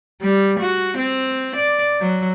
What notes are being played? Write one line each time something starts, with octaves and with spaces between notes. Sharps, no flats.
G3
F#4
C4
D5
F#3